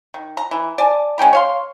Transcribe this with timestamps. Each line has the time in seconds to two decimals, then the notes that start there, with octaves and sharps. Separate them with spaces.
0.14 D#3
0.37 A#5
0.51 E3
0.78 D5 G#5 A5
1.18 G#3 C#4 G5 A#5
1.33 C#5 F5 C6